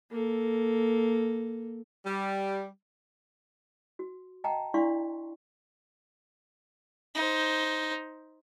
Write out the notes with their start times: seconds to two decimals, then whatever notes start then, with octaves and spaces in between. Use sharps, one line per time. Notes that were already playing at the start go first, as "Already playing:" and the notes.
0.11 A#3 A4
2.06 G3
3.99 F#4
4.44 D#5 F#5 G5 A5 A#5
4.74 D4 E4 D5 F5 C6 C#6
7.15 D#4 C5